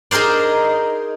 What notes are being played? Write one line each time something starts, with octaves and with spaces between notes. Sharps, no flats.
D#4 G#4 A#4 C5 D5